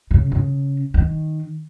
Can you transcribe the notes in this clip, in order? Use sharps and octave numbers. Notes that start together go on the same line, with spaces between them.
C#3
C#3
D#3